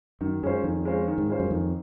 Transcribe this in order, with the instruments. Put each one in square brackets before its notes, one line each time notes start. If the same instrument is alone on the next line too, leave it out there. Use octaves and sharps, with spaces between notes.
[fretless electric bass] F#2 [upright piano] D#3
[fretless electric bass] F#2 [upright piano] G#3 C#4 F4 C5
[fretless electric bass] F2 [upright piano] D#3
[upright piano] G#3 C#4 F4 C5
D#3
[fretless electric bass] G#2
[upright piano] G#3 C#4 F4 C5
[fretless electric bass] F#2
[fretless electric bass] F2 [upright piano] D#3